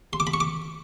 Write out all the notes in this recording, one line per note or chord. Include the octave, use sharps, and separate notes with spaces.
C6
D6
B5
C#6
D6